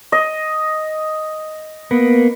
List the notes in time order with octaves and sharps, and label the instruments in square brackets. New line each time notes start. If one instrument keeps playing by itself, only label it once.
[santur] D#5
[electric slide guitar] A#3 B3